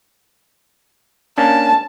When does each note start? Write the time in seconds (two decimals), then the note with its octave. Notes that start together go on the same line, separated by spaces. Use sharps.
1.38 A#3 C#4 D4 A5